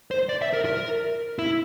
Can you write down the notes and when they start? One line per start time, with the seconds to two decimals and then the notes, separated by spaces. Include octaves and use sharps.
0.11 C5
0.29 D5
0.42 E5
0.53 A#4
0.65 A#4
1.39 E4